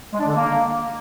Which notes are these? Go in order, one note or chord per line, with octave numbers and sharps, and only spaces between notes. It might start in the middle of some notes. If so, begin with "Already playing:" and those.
G#3
D4
D3
A#3